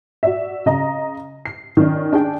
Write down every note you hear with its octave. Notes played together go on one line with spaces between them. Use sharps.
F#4 D5 E5
C#3 D#5 A#5
C7
D#3 C#4 D5
D4 G#4 G5